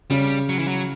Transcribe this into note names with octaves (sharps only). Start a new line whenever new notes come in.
C#3 G3
F#3
E3
F#3